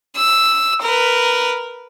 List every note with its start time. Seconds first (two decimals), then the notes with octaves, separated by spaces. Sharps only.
0.16 E6
0.81 A#4 B4